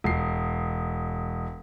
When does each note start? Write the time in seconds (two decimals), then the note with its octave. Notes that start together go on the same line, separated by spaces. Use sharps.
0.04 E1 C7